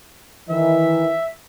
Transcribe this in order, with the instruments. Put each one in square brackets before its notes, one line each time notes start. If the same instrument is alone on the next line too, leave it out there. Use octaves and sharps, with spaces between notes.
[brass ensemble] D#3 E3 [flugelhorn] E5